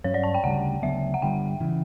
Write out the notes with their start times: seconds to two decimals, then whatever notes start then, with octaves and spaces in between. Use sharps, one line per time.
0.04 G2 F#3 C#4 C#5
0.14 D5
0.23 A5
0.34 G5
0.44 D2 C#3 G3 F#5
0.82 D2 C#3 F#3 B3 E5
1.14 F#5
1.22 G2 D3 G3 G5
1.60 C#3 E3